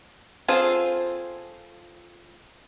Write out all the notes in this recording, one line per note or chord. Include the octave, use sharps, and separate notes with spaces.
C4 F4 G#4 A4 C5